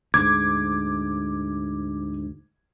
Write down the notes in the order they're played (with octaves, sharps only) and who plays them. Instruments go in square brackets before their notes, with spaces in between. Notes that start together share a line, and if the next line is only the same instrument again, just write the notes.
[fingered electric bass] D2 G#2 [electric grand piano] D6 G#6